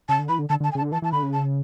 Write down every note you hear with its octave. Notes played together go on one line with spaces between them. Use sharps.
C#3 A5
D3
E3 B5
D3
D3 A5
D3 A5
G#5
C#3
A5
D3
E3 A5
E3 A5
D3 B5
C#3
A5